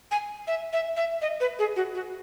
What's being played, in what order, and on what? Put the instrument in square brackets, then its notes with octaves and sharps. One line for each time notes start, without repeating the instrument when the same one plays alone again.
[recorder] G#5
E5
E5
E5
D#5
B4
G#4
F#4
F#4